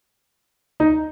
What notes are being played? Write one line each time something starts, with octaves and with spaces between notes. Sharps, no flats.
D#4